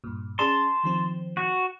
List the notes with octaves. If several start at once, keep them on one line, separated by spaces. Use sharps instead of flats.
G2 A#2
C#4 G#4 D5 A5 C6
D#3 F3 C4
F#4